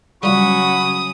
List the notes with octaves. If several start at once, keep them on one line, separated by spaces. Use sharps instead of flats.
C#3 F#3 G3 F4 F#5 B5 C#6 D#6